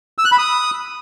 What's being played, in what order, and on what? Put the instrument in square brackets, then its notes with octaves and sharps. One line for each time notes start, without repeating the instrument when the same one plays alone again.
[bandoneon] E6
F#6
B5
D#6